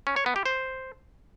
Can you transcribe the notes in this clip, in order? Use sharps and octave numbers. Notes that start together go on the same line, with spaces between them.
C#4
C#5
B3
G4
C5